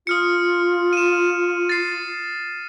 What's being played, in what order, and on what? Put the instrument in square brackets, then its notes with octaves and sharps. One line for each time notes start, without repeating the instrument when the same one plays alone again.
[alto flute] F4 [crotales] D#6 F6 C#7
[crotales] D#7 E7
A6 C7